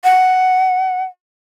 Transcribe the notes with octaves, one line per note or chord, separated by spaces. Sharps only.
F#5